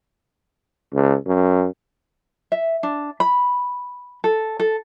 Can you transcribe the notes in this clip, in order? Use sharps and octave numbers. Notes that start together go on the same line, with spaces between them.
C#2
F#2
E5
D4
B5
A4
A4